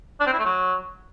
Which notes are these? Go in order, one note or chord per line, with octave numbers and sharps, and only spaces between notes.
D4
C4
E4
A3
F#3